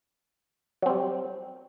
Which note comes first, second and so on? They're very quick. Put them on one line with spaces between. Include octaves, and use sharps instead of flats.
F#3 C4 G3